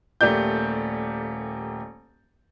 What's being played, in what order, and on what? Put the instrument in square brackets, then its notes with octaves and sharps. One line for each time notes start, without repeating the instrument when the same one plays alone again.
[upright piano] D#1 A3 A#3 G4 D5 G6